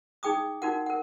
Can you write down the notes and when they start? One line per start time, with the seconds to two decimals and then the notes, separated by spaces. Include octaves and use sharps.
0.23 D#4 G#4 G5 D6 D#6
0.62 D#4 F#4 A#4 F#5
0.86 A#4 F#5